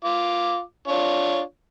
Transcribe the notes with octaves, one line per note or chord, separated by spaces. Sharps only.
F4 D6
D4 F4 C#5